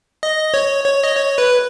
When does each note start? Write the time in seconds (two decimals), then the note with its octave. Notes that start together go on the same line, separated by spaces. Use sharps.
0.23 D#5
0.54 C#5
0.85 C#5
1.04 D#5
1.15 C#5
1.38 B4